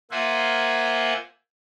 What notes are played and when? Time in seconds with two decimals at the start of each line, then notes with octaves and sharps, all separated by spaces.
0.11 A#3 F4 C5 E5 F#5 G#5